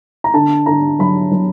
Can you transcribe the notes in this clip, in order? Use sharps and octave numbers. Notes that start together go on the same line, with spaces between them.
A#5
D3 A5
D3 A#5
F#3 B5
F#3